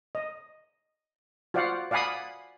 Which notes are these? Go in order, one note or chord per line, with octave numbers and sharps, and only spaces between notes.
D#5
F4 F#4 C5 D5 F5 F#5
D5 F5 F#5 G#5 B5 D#6